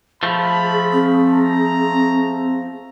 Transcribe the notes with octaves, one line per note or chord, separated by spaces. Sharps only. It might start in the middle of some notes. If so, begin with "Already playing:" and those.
F3 A3 G#4 B5
C4
A#5